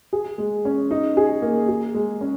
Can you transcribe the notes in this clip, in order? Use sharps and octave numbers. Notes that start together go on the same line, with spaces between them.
G#4
G#3
C#4
D#4
G#4
A#3
G#4
G#3
C#4